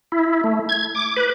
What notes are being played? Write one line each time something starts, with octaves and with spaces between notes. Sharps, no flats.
E4
A3
G#6
D6
B4